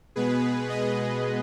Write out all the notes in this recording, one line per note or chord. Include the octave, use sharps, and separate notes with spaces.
B2 G#3 B3 G#4 B4
B4 D#5